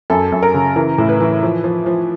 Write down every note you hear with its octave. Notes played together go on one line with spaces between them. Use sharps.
F#2 A4
F#2
A#4
C#3
E3 A#4
A2
B4
E3
F3
F3
F3